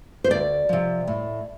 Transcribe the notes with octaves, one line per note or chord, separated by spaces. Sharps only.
C5
D2 D5
C3 F3
A2